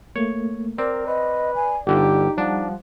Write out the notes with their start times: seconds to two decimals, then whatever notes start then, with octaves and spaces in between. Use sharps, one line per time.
0.16 A3 A#3 C#5
0.78 C4 A#4 D5
1.07 B4 D#5
1.55 G#5
1.87 G1 D3 D#4 G4
2.38 F3 G3 D4 F#5